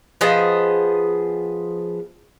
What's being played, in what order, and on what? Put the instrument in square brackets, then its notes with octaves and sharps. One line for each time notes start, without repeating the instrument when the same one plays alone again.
[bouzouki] F3 B3 G#4 D#5